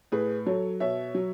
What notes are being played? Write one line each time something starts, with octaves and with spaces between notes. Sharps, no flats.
A2 G#4 B4
F#3 A4 C#5
B2 C#5 E5
F#3